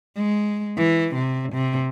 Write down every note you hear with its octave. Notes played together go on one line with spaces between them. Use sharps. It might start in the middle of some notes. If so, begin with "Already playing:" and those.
G#3
E3
C3
C3